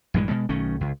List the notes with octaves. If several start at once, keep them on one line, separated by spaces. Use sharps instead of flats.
A#1 G2 E3 G#3
B2 G#3
B1 D#3 A3 C#4
C#2